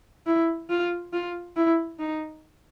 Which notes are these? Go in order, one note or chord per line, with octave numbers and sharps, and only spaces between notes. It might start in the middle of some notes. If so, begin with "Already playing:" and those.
E4
F4
F4
E4
D#4